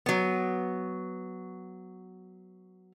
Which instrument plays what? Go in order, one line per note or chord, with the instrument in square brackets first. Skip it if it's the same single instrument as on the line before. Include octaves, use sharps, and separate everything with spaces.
[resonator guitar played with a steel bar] F#3 B3